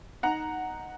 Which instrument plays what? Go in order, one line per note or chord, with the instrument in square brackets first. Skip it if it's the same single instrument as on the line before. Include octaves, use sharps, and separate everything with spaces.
[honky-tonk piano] D#4 F#5 A#5